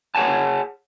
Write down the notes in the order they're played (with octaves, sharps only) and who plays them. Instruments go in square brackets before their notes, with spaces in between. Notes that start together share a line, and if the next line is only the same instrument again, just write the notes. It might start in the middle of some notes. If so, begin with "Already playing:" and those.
[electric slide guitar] G#4 C#5 F#5 G#5 A5